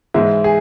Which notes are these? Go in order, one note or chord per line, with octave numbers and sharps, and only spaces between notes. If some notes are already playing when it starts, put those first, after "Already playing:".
G#2 E3 G#3 E4
G#4